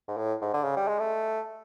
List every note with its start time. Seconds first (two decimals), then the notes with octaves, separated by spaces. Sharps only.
0.08 G#2
0.17 A2
0.42 G#2
0.54 D3
0.64 C#3
0.76 G3
0.88 G#3
0.99 A3